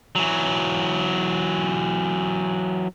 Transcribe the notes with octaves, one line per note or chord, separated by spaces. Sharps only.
E3 F#3